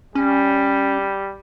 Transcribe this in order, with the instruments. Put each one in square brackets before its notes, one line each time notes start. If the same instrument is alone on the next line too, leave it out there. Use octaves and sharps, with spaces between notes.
[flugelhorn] G3 [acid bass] C#4